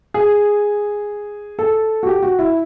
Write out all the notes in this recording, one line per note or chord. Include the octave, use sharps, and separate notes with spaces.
G#4
A4
F#4
G4
F#4
E4